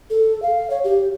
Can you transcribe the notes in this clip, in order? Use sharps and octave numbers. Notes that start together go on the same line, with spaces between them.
A4
F5
C#5
G4